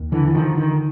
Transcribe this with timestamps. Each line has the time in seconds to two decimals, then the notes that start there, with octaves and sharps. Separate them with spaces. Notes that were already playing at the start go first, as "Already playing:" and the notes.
Already playing: D#2
0.12 D3 E3
0.27 E3
0.34 D3 D#3 F3
0.57 D#3